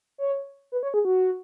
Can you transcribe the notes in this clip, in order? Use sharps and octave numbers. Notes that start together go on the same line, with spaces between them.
C#5
B4
C#5
G#4
F#4